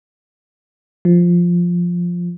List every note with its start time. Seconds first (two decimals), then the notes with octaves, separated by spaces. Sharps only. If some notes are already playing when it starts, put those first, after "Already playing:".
1.05 F3